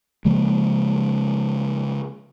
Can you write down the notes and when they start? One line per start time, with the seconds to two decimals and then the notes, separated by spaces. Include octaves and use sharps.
0.25 C#3 F3 G#3 A#3